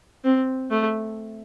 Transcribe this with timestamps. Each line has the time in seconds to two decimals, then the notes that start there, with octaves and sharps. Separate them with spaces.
0.24 C4
0.70 A3